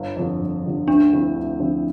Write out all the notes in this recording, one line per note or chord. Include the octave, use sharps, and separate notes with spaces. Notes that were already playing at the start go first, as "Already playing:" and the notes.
Already playing: G1
F2 D3 F3
G1
F2 D3 F3
D2 D4
D3 F3 C4 E4
D2
D3 F3 C4 E4